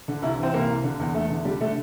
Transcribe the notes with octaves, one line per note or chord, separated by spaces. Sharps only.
D3
C2 E4
E3 C4
C2 A#3
C2
D3
E2
E2 A3
D3
D3 G3
D3 A3